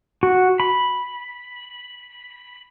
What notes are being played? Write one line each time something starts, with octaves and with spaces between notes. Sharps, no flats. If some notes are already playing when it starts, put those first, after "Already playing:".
F#4
B5